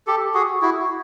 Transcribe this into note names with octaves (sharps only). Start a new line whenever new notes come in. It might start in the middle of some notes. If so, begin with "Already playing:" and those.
G4 A4
F#4 G#4
E4 F#4